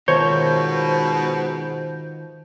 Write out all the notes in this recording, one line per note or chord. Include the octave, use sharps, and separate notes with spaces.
G#2 B2 D#3 F4 A#4 C5 C#5 G6